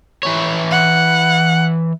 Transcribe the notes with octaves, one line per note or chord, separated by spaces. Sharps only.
E3 C#5
F#5